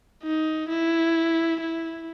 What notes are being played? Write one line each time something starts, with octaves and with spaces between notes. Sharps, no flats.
D#4
E4
E4